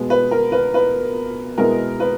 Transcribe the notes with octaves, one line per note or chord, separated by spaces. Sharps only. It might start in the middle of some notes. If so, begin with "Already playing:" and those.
Already playing: B2 G#3 B3
B4
A#4
B4
B4
B2 G#3 B3 E4 A#4
B4